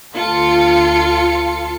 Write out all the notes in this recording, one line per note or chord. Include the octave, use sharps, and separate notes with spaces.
D2 F4 A4 F5 C#7